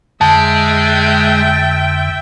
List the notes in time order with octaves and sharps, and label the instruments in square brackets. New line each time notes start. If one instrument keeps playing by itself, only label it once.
[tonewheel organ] F2 D3 [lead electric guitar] G#3 [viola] E5 G5 [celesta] A5